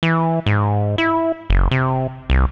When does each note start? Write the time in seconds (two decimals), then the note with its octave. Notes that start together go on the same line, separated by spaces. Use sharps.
0.03 E3
0.46 G#2
0.98 E4
1.50 F#1
1.71 C3
2.30 C2